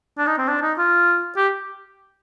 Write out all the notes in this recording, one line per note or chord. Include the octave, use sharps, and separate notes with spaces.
D4
D#4
C4
D4
D#4
F4
G4